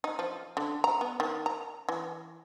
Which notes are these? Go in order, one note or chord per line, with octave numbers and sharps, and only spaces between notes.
D#4
F3
D3
A#5
B3
D#3
A#5
E3